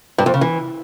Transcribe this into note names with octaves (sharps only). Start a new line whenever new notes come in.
G2
F2
C#3
E3